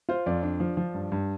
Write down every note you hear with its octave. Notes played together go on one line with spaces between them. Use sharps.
F4 C5
F2 D5
D4
F3
F3
G2
G2